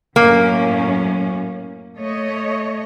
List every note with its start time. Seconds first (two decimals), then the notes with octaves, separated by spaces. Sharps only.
0.16 F#2 A2 A#3 C#4
1.98 A3 C#5 D#5